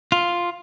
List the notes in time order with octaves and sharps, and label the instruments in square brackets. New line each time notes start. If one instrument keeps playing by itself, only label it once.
[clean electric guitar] F4